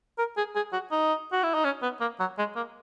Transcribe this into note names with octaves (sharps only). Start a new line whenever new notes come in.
A#4
G#4
G#4
F#4
D#4
F#4
E4
D#4
C#4
B3
A#3
F#3
G#3
A#3